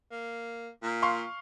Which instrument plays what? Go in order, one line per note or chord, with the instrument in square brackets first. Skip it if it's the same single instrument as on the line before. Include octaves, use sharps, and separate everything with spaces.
[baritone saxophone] A#3
A#2
[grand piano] F5 C6 C#6